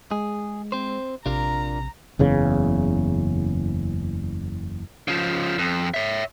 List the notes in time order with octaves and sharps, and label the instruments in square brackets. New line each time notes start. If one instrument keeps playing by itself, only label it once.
[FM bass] G#3 [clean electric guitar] G#4
[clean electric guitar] C4 C5
[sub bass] A#1 [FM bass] C3 [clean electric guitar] D4 F4 A#4 [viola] A#5
[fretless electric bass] F#1 E2 C#3
[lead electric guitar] C#3 F3
F2
C#5 E5